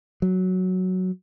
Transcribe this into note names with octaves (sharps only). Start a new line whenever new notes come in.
F#3